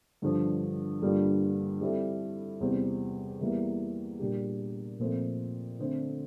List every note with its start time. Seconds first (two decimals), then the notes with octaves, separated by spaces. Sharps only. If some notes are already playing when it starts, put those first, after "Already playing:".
0.22 G2 D3 F3
1.02 G2 D3 G3 A#3 F4
1.81 G3 C4 E4 A4
2.60 E2 C3 G3 C4
3.40 E2 E3 G3 A#3 E4
4.19 A#2 G3 D4 G4
4.99 A#2 F3 A3 C4
5.79 D3 A3 C4